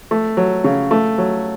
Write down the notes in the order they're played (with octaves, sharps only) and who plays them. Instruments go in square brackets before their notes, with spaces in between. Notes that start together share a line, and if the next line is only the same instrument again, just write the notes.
[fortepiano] A3
F#3
C#3
A3
F#3